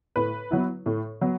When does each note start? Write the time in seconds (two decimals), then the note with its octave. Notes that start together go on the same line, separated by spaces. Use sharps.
0.16 A2 B4
0.51 F#3 B3 E4
0.86 A2
1.21 F#3 B3